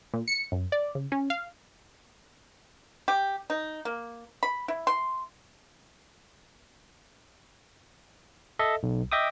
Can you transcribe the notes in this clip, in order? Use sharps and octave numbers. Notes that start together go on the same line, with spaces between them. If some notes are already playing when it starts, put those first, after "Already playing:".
A#2
C#7
F#2
D5
C#3
C#4
F5
G4
D#4
A#3
B5
E4
C6
A4 D#5 E5
B1
D#5 E5 G5 D6 D#6